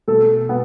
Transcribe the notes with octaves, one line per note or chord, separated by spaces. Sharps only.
B2 A3 A4
B2 B3